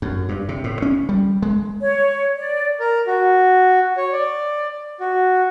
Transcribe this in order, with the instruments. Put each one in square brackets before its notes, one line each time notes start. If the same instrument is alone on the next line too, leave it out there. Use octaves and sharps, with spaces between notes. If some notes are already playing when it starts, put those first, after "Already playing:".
[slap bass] F#2
G2
C3
A2
C#4
G3
G#3
[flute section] C#5
D5
[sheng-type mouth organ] A#4
F#4
C#5
D5
F#4